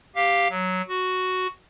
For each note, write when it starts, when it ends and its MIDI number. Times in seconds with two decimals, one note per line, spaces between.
0.15 0.48 67
0.15 0.48 77
0.50 0.82 54
0.88 1.47 66